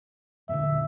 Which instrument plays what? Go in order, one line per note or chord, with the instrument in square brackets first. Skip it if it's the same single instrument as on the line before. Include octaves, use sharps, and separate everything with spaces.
[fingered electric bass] E2 A#2 D3 [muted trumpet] E5